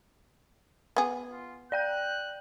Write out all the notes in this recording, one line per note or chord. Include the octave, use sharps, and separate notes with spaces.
B3 G#4
F4
D5 G5 F#6 G6